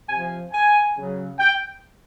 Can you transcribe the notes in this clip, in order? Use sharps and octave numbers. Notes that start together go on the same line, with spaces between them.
C3 F3 G#5
G#5
C#3 F#3
G5